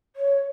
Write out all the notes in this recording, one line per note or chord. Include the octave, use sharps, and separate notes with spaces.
C#5